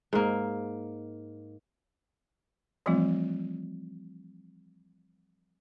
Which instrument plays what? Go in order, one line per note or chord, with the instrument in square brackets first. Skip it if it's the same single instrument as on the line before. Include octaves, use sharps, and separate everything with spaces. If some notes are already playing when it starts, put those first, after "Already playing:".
[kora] G#2 A#3
[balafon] E3 F3 G3 A3 C4 F4